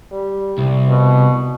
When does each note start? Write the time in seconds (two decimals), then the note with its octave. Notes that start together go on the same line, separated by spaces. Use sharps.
0.12 G3
0.58 C2
0.89 B2